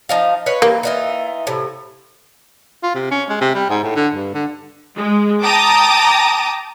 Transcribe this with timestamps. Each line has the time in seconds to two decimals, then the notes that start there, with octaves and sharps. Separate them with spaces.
0.09 F3 D#4 D#5 F5
0.46 B4 C#5 F5
0.62 E3 A#3 G4
0.83 E3 D#4 F4 E5
1.47 A2 C3
2.83 F4
2.94 C3
3.11 C#4
3.29 G#3
3.41 C3
3.54 G3
3.70 G#2
3.83 A2
3.96 D3
4.14 G2
4.34 D3
4.97 G#3
5.44 G5 A5 A#5 D6 D#6